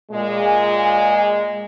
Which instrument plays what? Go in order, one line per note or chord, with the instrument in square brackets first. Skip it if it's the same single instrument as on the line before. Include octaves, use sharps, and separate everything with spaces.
[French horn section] A#2 G#3